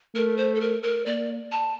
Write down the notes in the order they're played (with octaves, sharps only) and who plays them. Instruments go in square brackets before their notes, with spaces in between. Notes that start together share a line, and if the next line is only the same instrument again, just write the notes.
[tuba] A3 [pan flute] A#4
[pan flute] C5
A4
A#4
A#4
[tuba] A#3 [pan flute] D5
[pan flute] A5